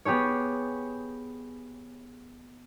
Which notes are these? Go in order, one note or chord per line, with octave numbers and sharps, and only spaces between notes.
B3 G4 G#4 C#5